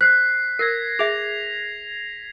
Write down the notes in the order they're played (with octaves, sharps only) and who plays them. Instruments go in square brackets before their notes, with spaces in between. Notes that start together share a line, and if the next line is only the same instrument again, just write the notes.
[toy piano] C5 [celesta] F#6 [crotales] B6 C7
[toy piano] A#4 [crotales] G#6 A#6 C7
[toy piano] G#4 E5 [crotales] F7